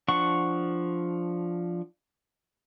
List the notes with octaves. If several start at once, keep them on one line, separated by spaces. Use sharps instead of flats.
F3 D4 F#5 C#6